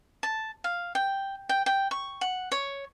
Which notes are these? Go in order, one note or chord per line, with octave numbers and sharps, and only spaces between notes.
A5
F5
G5
G5
G5
C#6
F#5
C#5